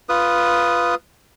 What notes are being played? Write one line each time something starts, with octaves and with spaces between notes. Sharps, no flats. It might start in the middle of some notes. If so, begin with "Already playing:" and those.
F4 B4 D#6